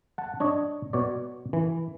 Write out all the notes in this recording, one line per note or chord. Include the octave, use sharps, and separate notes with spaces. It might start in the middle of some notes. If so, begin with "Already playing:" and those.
F#5 A5
D4 C#5 D#5
B2 C#5 D5
E3